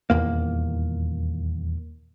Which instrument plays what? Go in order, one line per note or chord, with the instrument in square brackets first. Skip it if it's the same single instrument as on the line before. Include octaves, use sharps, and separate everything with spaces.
[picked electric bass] D#1 G#1 E2 A#3